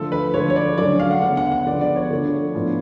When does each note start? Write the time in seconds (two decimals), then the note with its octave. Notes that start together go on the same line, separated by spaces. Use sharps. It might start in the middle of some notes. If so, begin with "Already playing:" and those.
Already playing: D3 F3 A3 A4
0.12 B4
0.33 D3 F3 G#3 C#5
0.50 C#5
0.56 D5
0.78 D3 F#3 A3 C#4 D5
1.00 F5
1.11 F#5
1.22 C#3 G#3 B3 D4 F#5
1.37 F#5
1.52 F#5
1.67 D3 F3 B3 D5
1.81 D5
1.96 C#5
2.10 D3 F3 A3 D4
2.55 A2 F3 B3 D4